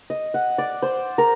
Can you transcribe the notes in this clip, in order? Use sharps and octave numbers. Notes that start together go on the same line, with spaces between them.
D#5
F#5
D5
C5
A#4